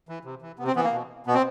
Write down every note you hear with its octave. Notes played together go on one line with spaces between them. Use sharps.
E3
C3
E3
C3 B3
C4
E3 B3
A#3
B2
B2 B3
C4